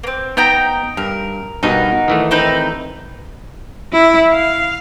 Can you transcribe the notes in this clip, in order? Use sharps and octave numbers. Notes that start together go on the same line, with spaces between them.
A#3 C4
B3 D#4 G5 A#5
G2 A#4
G2 B2 D#4 A#4 F#5
D#3 E3 A3
C4 D#4 B4
E4
F5